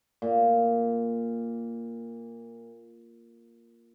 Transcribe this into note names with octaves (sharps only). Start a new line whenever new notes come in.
A#2